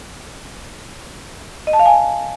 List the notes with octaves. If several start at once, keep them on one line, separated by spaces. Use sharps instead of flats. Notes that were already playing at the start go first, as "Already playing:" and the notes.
D#5
A5
F5
G#5